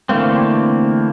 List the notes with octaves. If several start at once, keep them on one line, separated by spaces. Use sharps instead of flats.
D3 E3 A3 A#3 C4